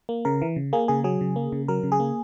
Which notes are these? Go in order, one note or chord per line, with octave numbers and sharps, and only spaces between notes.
A#3
C#3 A#4
E3
C#3
A#3 G#4
C#3 G#4
F#3 G#4
C#3
A#3
C#3
F#3 A#4
C#3
G#4
A#3